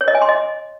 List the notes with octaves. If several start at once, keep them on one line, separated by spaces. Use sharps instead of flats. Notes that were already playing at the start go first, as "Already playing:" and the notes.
C#5
D#5
G#5
C6
D#5